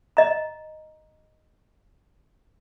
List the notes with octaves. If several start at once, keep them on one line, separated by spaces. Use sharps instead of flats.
D#5 A#5